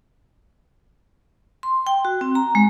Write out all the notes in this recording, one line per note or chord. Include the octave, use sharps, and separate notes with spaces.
C6
G5
F#4
C4
A#5
G#3